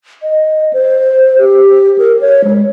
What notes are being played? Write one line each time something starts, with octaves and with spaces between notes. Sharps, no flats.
D#5
C5
G4
A#4
C#5
G#3